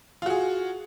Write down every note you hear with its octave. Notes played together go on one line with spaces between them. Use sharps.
F4 F#4 G#4